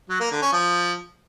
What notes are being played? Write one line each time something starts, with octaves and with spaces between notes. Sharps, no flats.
F#3
A#3
D3
C#4
F3